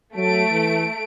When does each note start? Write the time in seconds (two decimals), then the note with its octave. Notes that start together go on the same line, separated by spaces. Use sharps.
0.16 F#3 A3 D7
0.51 E3